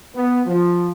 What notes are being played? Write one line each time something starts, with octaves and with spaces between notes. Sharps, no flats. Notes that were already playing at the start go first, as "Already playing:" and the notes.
B3
F3